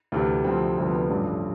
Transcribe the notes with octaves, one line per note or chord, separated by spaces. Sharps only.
D2 C3 E3
D2 C3 F3 C4
D2 C3 F3 C4
B3
C4
A1 G2 D3 F3